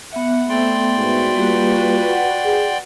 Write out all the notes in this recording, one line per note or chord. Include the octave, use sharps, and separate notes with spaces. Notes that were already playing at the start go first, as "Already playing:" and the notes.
B3 E5 F#5
A3 C4 D5 G5 C6
G#2 F#4 B4
G3 A#3 F4 G4
F#5
G#4